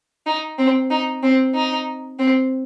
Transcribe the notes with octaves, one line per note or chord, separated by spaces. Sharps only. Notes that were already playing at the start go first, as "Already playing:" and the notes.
D#4
C4
D#4
C4
D#4
C4